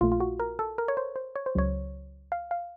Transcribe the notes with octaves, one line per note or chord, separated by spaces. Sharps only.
A#1 A#2 A3 F4
F4
F#4
A#4
A4
A#4
C#5
C5
C5
C#5
C5
C#2 C#3 F#3 C#5
F5
F5